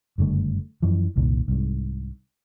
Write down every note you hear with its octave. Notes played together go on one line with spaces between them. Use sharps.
F#1 G2 D3 A3
F#2 E3 F3
F#1 C2 A#2 D#3
C2 G#2